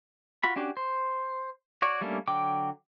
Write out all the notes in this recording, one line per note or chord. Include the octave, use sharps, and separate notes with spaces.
F4 F#4 B5
C#4 D4 F#4 G4
C5
F#4 C#5 D5
G3 A3 A#3 C#4 D4
D3 F#3 G5 D6